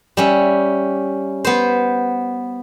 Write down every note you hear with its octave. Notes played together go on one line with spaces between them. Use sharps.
G3 C#4 E5
B3 C5